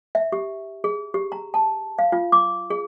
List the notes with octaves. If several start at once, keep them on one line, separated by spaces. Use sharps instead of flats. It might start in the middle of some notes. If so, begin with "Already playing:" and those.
E5
G4
G#4
G4
A#5
A5
F5
F4
D6
G#4